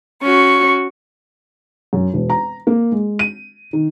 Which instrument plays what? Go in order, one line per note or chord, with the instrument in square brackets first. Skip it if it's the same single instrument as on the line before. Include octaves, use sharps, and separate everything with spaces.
[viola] C#4 F#4 [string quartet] C#6
[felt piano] F#2
E1
A#5
A#3
G#3
D#7
D#3